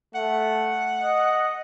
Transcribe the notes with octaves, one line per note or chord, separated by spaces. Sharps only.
A3 F#5
D#5